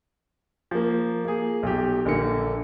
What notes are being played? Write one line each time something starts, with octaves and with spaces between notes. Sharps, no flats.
F3 A#3
A#3 G#4
B1 G4
A#1 D3 A#3 C#7